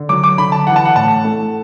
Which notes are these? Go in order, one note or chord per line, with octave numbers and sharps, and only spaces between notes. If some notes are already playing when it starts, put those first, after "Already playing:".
Already playing: D3
F#3 D6
D6
D3 B5
A5
E3 F#5
A5
F#5
A2 A5
A3